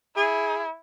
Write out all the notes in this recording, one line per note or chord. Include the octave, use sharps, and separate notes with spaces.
E4 G#4